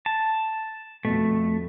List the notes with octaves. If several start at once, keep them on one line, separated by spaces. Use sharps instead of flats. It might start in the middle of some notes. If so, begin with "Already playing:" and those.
A5
F2 B2 A3